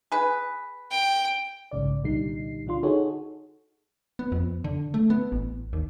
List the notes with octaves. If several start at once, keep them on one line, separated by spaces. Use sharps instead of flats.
G#4 B4
G5
A#1 G#2 C#3 D5
C2 A#2 D3 G3 D#4 C7
D3 D4 F4 C6
D#4 F#4 G#4 A4 C#5
B3
F2
D3
A3
B3
A1
D#2